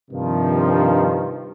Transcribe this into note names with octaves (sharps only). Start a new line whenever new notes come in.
G2 C3 D#3 F3